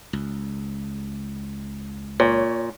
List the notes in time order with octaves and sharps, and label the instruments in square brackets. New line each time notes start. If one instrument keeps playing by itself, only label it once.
[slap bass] C#2
[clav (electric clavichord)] A#2 [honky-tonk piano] C#5